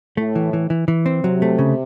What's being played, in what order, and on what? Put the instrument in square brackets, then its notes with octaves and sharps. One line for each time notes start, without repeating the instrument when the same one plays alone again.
[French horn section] A2 [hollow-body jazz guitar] A3
[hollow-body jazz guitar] E3
E3
E3
E3
C4
[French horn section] C3 [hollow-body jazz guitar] F#3
[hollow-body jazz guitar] A3
C#3